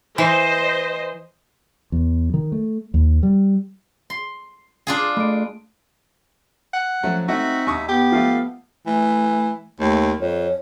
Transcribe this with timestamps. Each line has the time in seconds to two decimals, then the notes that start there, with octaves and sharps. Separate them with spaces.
0.18 E3 C5 D#5
1.92 E2
2.34 D#3
2.52 A3
2.94 D#2
3.23 G3
4.10 C6
4.87 D4 F4 G#4
5.17 A3 D7
6.73 F#5
7.03 F3 F#3 A3 C#4
7.28 A3 C4 D#4 F#4 E5
7.67 D#2 C#6 D#6
7.89 B3 G4
8.12 F3 A3 A4 F5
8.87 E3 A3
9.80 D#2 A3
10.20 F2 C#5